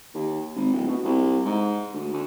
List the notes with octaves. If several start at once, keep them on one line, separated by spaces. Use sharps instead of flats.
D#2
G#1
D1
B2
C2
G#2
D2
D2